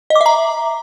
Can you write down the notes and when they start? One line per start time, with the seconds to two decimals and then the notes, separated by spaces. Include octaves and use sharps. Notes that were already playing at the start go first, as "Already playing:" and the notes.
0.10 D#5
0.15 D6
0.21 E5
0.26 A#5